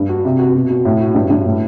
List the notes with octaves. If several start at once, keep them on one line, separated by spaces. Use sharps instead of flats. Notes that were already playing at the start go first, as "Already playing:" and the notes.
Already playing: G2
F#4
C3
F#4
B2
B2
A2
F#4
G2
G2
A2